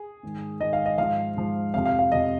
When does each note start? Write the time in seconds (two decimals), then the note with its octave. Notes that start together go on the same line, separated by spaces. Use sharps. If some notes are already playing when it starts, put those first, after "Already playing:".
Already playing: G#4
0.23 G#2 D#3
0.60 G#2 D#3 D#5
0.73 F5
0.86 D#5
0.98 G#2 F3 F5
1.37 G#2 F3
1.74 F2 C3 F3 F5
1.86 F5
1.99 F5
2.11 F2 C3 F3 D#5